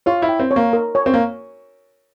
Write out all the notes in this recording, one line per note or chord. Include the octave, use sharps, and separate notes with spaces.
F4 C#5
E4
G5
C4
C#5
A#3
A#4
C#5
C4
A#3